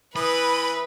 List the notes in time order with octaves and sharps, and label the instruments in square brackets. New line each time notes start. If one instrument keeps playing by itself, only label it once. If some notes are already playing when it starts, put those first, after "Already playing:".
[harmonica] E3 D#6 [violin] B4 [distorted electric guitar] B5